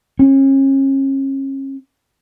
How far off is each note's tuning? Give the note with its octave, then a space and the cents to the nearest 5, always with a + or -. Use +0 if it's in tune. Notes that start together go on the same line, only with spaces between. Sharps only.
C#4 -35